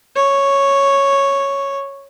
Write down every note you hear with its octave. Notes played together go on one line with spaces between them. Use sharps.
C#5